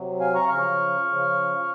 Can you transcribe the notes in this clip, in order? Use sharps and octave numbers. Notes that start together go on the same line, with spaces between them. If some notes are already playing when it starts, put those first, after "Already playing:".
Already playing: C3 F#3
F5 G#5
A#5 C#6
C#3 F3 C#6 F6
C#3 F3